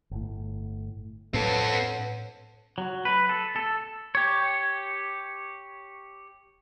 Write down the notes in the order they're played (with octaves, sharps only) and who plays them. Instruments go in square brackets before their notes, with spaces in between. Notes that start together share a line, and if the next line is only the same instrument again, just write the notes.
[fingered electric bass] G1 A2
[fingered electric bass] A2 D4 [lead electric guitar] C4 A4 [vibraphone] B4 C#5 F#5
[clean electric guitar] F#3
B4
A4
A4
[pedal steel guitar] G4 C#5